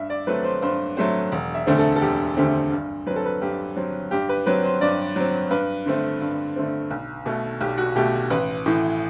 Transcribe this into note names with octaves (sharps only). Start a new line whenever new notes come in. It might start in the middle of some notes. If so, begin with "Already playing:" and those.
Already playing: G2 E5
D5
F#3 A3 C4 B4
C5
G2 C5
F#3 A3 C4 C5
E1
E5
D2 D3 A3 C4
A4
A4
E1 G4
D2 D3 A3 C4 G4
G2
F#3 C4 B4
A4
B4
G2 G4
F#3 C4
G2 G4
B4
F#3 C4 B4
C5
G2 D5
F#3 C4
G2 B4
D3 A3 C4
G2
D3 A3 C4
B1
B2 A3
B1 G4
F#4
B2 A3 G4
A1 B4
A2 E3